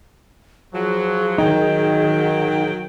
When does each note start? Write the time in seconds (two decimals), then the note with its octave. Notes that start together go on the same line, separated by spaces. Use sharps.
0.74 F3 F#3 G#4
1.38 D#3 F#3 D#4 G5